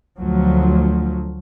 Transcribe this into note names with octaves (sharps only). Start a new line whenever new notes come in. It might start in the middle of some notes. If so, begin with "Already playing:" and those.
D2 F3 F#3